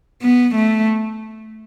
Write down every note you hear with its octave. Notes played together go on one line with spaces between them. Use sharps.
B3
A3